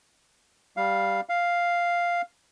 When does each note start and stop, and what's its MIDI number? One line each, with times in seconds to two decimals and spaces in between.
0.77 1.21 55
0.77 1.21 77
1.29 2.22 77